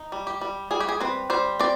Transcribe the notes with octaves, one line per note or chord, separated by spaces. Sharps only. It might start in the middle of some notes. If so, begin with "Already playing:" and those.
Already playing: D#4
G3
G4
G3
G3 G#4
G4
G#4
C4 B4
G3 C5
C4 D5